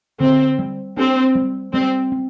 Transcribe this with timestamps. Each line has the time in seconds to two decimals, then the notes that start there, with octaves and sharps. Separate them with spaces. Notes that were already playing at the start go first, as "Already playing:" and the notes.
0.20 D3 C4
0.59 G3
0.97 C4 D4
1.35 G3
1.73 G3 C4
2.12 C4